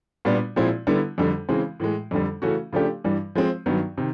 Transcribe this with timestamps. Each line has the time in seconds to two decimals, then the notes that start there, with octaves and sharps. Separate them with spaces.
0.25 A#2 G3 B3 D4
0.56 A#2 F3 G#3 C4 E4
0.87 D3 G3 B3 E4
1.18 F2 D3 G3
1.49 C#3 E3 G#3 C4
1.80 A2 E3 G#3
2.11 F2 D3 G3
2.42 C#3 E3 A3 C#4 F#4
2.73 C#3 F3 A3 D4 G4
3.04 G2 E3 G3
3.35 F3 G#3 C4
3.66 G2 D#3 F#3 B3
3.98 C3 D#3